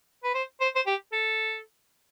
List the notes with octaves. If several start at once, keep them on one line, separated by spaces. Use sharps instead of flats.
B4
C5
C5
C5
G4
A4